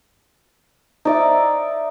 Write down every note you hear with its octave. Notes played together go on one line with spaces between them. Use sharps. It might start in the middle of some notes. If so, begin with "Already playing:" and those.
D#4 D5 E5